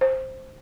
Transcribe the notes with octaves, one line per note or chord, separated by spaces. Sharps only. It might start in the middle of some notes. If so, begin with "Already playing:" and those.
C5